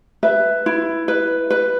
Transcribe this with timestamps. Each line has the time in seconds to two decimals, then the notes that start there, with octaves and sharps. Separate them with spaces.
0.23 B4 E5
0.66 E4
1.08 B4
1.50 B4